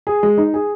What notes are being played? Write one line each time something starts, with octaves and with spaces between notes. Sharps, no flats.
G#4
G#3
D#4
G#4